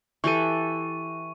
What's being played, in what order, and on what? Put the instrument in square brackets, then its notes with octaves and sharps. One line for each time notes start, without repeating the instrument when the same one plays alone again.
[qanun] E3 G4 A4 [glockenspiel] C#6 D#7